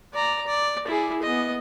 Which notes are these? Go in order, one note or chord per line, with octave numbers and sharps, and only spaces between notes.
D5 A#5
D5
E4 G#4
B3 D#5